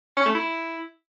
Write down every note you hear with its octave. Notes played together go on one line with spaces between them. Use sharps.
C#4
A3
E4